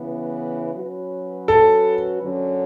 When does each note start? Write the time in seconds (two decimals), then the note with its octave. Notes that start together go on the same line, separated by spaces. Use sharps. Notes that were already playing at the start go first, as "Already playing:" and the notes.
Already playing: C#3 E3 B3
0.74 F#3 C#4 F#4 B4
1.48 A4
2.22 F#2 D3 F#3 C#4